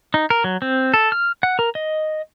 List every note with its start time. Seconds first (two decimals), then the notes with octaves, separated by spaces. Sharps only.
0.14 D#4
0.30 A#4
0.44 F#3
0.62 C4
0.94 A4
1.12 F6
1.43 F#5
1.59 A#4
1.75 D#5